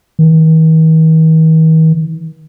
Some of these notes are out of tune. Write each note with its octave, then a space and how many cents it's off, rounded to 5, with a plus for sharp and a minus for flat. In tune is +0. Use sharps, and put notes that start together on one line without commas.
D#3 +45